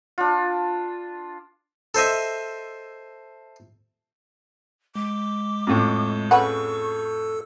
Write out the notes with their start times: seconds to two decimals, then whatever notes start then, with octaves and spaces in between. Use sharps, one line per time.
0.18 D4 F4
1.95 A4 C5 D#5 E5
4.96 G#3 D6
5.67 F2 A2
6.31 C#3 A4 B4 F#5 C#6 E6